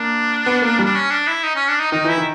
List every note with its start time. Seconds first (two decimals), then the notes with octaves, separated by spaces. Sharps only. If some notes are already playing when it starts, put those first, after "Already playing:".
Already playing: A#3 D4
0.46 B3
0.62 A#3
0.79 G3
0.85 D4
0.95 C#4
1.10 D4
1.27 E4
1.43 D#4
1.56 C#4
1.68 D4
1.80 D#4
1.92 D#3 D#4
2.04 E3 E4
2.17 D#3